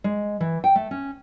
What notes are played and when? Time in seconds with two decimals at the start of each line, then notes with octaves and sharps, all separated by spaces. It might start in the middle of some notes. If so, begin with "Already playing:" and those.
0.04 G#3
0.40 E3
0.64 G5
0.75 A3
0.91 C#4